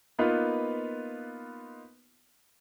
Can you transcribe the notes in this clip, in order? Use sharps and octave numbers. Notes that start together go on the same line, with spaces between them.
A#3 B3 D#4 F4 B4